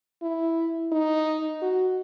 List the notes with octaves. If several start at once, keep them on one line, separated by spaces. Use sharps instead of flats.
E4
D#4
F#4